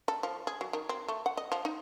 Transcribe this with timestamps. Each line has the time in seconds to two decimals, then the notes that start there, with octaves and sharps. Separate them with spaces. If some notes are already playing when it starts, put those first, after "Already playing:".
0.08 A4
0.23 F3
0.47 G#4
0.61 F#3
0.73 D#3
0.89 C4
1.08 A3
1.26 F#5
1.37 D#5
1.52 F3
1.65 D#4